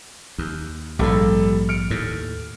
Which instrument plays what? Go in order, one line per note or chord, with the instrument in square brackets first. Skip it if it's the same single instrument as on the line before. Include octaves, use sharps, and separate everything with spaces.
[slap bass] D#2
[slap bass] A#1 G#2 [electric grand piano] G3 A4
[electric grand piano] F6 C#7 D7
[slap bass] D#2 A2